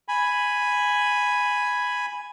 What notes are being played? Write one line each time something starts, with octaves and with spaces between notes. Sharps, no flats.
G#5 B5